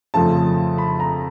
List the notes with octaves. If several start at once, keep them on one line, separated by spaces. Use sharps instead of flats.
F2 C#3 F3 A3 A5
B5
A#5